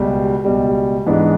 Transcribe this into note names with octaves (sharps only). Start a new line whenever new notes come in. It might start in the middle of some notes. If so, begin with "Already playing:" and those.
Already playing: C#2 B2 G3
C#2 B2 G3
G#2 E3 G#3 B3 D4